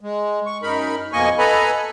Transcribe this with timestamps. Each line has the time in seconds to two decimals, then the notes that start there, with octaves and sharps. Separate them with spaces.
0.01 G#3
0.46 C#6
0.62 F#2 D#4 A#4 B5
1.12 F2 B2 A#3 D#5 G#5 C#6
1.38 A4 B4 D#5 G#5 A#5 B5